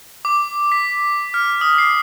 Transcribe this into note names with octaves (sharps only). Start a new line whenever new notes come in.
D6
B6
F6
D#6
C7